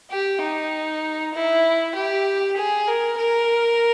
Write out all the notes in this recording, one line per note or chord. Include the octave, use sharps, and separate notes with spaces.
G4
D#4
E4
G4
G#4
A#4
A#4